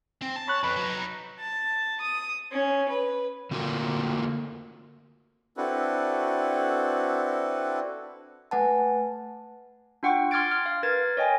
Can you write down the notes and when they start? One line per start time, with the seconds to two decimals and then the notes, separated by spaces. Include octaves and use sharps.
0.22 C4
0.36 A5
0.48 C#5 B5 F#6
0.64 F2 B4
0.76 F#3 D#4
1.40 A5
2.01 D#6
2.52 C#4
2.89 B4
3.51 D3 A3 A#3 F4 F#4 A#4
5.57 C4 D4 E4 F#4 A4 B4
8.51 A3 B4 F#5 G#5 A5
10.03 D4 F4 F#5 G5 C#6
10.31 C6 D6 F6 G#6 A6 D7
10.51 F6
10.66 F5
10.83 A#4 B4 G#6 A6
11.17 C#5 D#5 G5 G#5